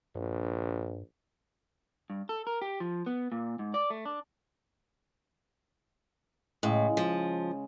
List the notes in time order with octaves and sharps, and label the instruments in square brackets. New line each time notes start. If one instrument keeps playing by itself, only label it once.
[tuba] A#1 [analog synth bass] G2
[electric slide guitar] G2
A4
A#4
G4
F3
B3
A#2
G#2
D5
A3
D4
[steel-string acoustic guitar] A2 [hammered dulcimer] C#3 G#3
[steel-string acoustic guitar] F3